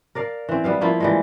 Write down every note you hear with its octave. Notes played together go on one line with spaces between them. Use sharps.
A#4 D5 F5
E3 C4
G3 B3 F5
F3 A#3 E4 F4
E3 G3 G#3